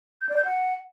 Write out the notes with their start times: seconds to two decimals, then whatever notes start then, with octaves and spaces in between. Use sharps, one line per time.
0.21 G6
0.29 D5
0.37 G6
0.45 F#5